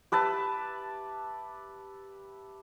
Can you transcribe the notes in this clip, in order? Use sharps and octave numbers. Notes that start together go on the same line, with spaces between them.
G4 B4 E5 A5